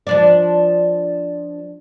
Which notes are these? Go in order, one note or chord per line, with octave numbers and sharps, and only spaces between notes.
F3 D4 D5